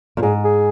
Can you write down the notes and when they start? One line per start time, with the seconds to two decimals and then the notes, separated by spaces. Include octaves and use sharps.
0.17 F2
0.22 G#2 G#4
0.44 G#4